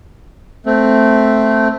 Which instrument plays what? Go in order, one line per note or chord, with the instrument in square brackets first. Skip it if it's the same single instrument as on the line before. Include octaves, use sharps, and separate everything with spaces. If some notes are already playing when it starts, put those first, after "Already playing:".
[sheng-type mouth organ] A3 C4